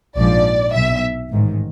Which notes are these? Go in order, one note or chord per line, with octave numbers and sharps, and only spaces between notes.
A#1 G#2 F3 D5
B1 B2 E5
A1 G#2 D#3